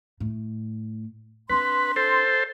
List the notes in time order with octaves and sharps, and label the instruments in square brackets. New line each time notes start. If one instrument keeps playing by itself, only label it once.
[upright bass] A2
[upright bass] C4 D4 [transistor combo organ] B4 [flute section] C6
[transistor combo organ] A4 C5